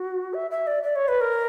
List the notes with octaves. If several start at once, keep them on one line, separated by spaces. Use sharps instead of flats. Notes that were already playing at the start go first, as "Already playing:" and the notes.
Already playing: F#4
E5
E5
D5
D5
C#5
B4
A#4